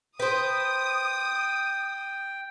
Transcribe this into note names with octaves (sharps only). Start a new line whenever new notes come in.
B4 C5 G5 D#6